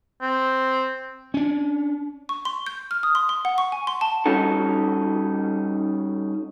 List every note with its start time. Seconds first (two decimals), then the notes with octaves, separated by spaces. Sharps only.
0.22 C4
1.34 C#4 D4
2.29 C#6
2.45 C6
2.66 G6
2.91 F6
3.03 D#6
3.15 C6
3.29 C6
3.45 F#5
3.58 C#6
3.72 G#5
3.87 C6
4.01 A5
4.26 G3 C#4 D#4 F#4 A4